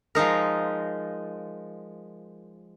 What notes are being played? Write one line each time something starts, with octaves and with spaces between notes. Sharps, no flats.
F3 G#3 D#4 A#4